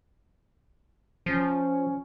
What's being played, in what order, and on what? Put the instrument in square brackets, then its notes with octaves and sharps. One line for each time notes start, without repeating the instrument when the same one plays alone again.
[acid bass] F3 [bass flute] C#4